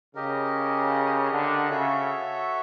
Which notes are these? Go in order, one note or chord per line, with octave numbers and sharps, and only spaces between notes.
C#3 G4 A#4 D#5
D3
C#3 F#4 A4 C#5 E5